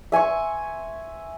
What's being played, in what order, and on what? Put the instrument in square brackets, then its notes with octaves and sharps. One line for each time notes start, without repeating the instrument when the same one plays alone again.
[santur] E5 G#5 C6 C#6